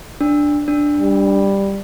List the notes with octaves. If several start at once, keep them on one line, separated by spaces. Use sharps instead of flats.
D4
D4
G3